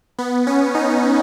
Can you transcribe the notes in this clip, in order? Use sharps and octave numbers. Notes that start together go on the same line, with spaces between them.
B3
C#4
D#4